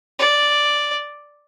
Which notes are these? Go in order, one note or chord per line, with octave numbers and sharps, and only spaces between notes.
D5